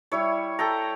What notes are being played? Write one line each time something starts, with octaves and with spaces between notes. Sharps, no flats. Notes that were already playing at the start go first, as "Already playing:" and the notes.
G3 E4 C#5
A4 G5 A#5